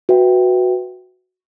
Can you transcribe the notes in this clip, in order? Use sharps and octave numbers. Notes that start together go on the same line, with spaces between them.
F#4 B4 E5 G5